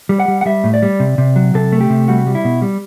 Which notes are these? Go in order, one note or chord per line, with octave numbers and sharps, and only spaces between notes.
G3
F#5
G3
F#5
G3 E5
A2
D5
G3
C3
C3
F#3
C3 A4
A3
G4
C3
G3 F#4
G3
E4
B2
G3